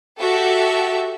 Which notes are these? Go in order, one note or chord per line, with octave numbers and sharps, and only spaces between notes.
F#4 G4 A4 E5